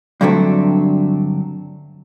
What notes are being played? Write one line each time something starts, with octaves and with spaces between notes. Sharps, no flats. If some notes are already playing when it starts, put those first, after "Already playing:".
G2 D3 F#3 A3 C4